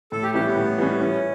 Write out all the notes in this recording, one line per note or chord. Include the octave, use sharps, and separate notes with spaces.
A2 A4
G4
E3 G3 C#4 G4
B3
A2
E3 G3 C#4
E3 C#4